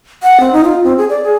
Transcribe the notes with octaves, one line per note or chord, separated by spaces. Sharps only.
F#5
C4
D#4
F4
C4
G#4
D5
G#4